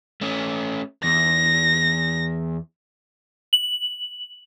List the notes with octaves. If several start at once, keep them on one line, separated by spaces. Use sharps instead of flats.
A3 C#4
E2 A#6
F#7